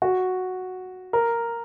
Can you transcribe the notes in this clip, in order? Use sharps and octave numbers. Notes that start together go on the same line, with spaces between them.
F#4
A#4